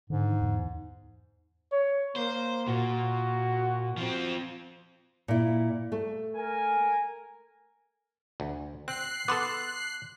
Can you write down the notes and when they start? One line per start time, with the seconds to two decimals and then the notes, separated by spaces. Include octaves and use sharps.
0.10 G#2 D3
0.41 E2
1.72 C#5
2.16 A#3 C5
2.68 A#2 F#4
3.97 F3 C4
5.28 A#2 E4
5.92 A3
6.36 A#4 G#5
8.40 D2
8.88 C4 F#6 C7
9.28 B3 A4 C6 D6